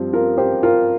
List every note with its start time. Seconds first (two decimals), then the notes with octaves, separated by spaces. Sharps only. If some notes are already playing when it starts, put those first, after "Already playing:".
Already playing: G2 F3 C4
0.13 F4 A#4
0.38 G4 C5
0.63 F4 A#4